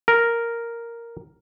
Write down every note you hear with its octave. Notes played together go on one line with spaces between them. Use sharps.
A#4